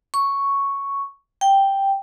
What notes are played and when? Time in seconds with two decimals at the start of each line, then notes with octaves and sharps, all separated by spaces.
0.14 C#6
1.41 G5